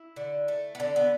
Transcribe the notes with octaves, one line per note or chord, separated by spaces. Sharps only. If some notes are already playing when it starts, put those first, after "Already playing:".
Already playing: E4
D3
A3
B3
D3 D4
B3